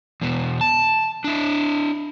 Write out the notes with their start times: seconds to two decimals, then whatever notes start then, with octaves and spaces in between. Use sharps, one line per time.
0.21 E2 B2
0.61 A5
1.24 D4 E4